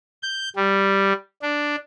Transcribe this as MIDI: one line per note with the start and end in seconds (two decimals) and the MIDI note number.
0.23 0.49 91
0.56 1.13 55
1.42 1.76 62